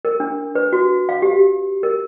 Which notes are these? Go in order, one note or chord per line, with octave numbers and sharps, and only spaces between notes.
A#4
D4
B4
F#4
F5
G4
A#4